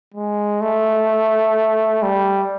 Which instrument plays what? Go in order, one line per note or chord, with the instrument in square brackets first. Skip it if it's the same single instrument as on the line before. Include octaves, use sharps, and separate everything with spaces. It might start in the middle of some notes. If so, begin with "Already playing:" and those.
[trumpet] G#3
A3
G3